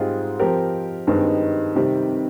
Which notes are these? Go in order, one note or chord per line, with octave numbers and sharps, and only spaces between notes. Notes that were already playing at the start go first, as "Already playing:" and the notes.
Already playing: G#2 G3 C4 F4 G#4
F3 C4 G4 A#4
G2 D#3 G#3 C4 D#4
C3 D#3 G3 C4